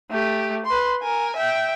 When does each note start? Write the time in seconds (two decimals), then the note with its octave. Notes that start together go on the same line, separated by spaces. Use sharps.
0.11 A3 G4
0.66 B4 C6
1.02 A#4 G#5
1.36 E5 G5